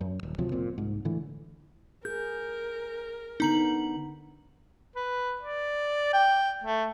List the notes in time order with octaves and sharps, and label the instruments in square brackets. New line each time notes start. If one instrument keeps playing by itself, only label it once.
[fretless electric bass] F#2
D#1
D2 C3 F3 F#3
F#1 A#2 C4
C2 G#2
A2 D3 E3 A3
[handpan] G#4 [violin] A#4 [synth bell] G6
[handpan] D3 B3 D4 [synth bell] D#4 A#5 F#7
[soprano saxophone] B4
D5
G5
A3